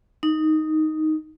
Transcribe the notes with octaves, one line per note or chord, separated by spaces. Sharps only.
D#4